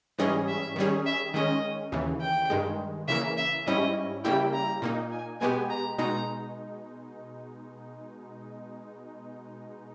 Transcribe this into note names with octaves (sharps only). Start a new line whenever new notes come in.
G#2 E3 G3 C#4 G#4 D#5
E5
D#3 G3 C#4 G#4
E5
D#3 G#3 C#4 D#5
D#2 C#3 E3
G5
G2 D#3 G#3
C#3 E3 A#3 E5
E5
G#2 G3 C#4 E4 D#5
C#3 G3 A#3 E4 G4 G5
A#5
A#2 A#3 D#4
G#5
B2 G#3 B3 G4 G#5
A#5
B2 G#3 D#4 A#5